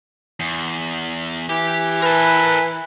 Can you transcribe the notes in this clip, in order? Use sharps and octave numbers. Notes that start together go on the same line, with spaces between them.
E2
E3 G4
A#4 B4 A5